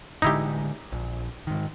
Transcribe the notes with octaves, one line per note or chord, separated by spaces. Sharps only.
A1 D3 G#3 D#4 E4 G4
A#1
G#2 D#3